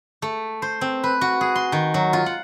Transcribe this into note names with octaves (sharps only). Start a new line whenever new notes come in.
A3
C5
C4
B4
F#4
G#4
C6
D#3
F#3
F4
F#5